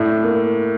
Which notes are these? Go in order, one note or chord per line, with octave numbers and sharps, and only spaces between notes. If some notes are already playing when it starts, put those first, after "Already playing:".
Already playing: A2 D4
A#3